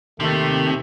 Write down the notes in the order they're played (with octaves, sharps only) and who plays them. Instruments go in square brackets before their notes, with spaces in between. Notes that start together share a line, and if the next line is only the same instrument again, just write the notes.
[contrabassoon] D#2 [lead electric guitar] C3 [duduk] D#3 [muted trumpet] A3